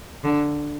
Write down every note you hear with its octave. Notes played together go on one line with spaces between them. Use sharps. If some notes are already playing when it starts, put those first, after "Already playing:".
D3